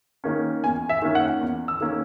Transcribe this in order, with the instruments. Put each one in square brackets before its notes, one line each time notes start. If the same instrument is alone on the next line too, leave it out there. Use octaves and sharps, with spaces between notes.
[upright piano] D#3 A#3 C#4
E2 G#5
E5
D#3 A#3 C#4
F#5
E2
E6
D#3 A#3 C#4